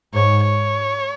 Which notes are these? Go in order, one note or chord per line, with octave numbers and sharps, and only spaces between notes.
G#2 C#5
C#5